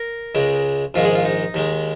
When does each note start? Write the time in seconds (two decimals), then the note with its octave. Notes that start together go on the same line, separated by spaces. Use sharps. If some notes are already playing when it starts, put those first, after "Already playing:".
Already playing: A#4
0.35 C#2 C#3 G#3
0.94 A#1 G#2 D#3 G#3 F4
1.05 G#4
1.15 F4
1.25 D#4
1.54 D#2 D#3 G#3